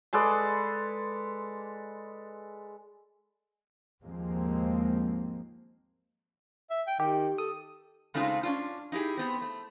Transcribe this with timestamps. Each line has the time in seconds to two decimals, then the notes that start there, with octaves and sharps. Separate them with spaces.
0.13 G#3 A4 B4 D5
4.03 D#2 G#2 F3 G#3 A#3 C4
6.71 E5
6.87 G5
7.00 D#3 G4
7.38 A4 D#6
8.14 C#3 G#3 A3 C4 D#4 F4
8.43 C#4 D4 F4
8.92 D#4 E4 G4 G#4
9.17 B3 C4
9.41 A3